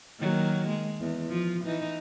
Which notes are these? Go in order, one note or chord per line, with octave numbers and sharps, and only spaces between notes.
D#3 F#3 A#3
G#3
E2
F3 F4
E3 D#4